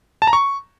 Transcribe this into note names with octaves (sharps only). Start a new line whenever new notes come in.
A5
A#5
C#6